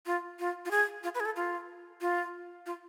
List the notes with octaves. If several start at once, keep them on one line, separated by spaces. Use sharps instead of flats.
F4
F4
F4
G#4
F4
B4
G#4
A4
F4
F4
F4